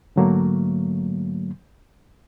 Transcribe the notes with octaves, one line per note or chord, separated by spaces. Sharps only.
G#2 D3 F#3 A3 A#3